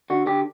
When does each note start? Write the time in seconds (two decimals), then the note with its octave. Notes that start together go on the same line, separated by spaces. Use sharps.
0.10 D3 F#4
0.26 D3 G4